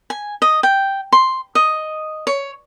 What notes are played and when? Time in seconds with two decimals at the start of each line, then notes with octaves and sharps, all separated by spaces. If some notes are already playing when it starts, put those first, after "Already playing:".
0.10 G#5
0.42 D#5
0.63 G5
1.13 C6
1.55 D#5
2.27 C#5